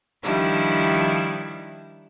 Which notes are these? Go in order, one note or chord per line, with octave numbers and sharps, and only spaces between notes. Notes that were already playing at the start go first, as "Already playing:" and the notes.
D#3 F3 G3 D4 E4